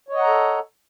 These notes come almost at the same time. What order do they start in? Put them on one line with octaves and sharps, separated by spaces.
C#5 D#5 F#5 A#5 A4